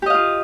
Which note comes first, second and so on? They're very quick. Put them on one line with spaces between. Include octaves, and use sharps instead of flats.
G4 D#5 F5 F4